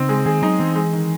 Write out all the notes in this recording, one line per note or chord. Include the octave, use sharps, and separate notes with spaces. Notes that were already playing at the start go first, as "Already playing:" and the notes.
Already playing: C#3 C4 D#4
G#3
D#3 G#4
F#3 D#4
E3 C4
G#3
D#3